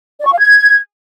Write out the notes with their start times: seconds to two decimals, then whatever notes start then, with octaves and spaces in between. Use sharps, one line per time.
0.20 D5
0.26 C#6
0.32 F5
0.39 G#6